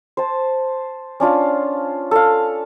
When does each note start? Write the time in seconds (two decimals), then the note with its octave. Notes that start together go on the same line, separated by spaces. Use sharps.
0.17 C5 A5
1.20 C#4 D4 F4 F5
2.11 A4 F5